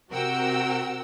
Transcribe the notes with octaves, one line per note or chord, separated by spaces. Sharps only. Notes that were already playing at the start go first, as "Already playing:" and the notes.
C3 F#4 A#4 F#5 G5 E6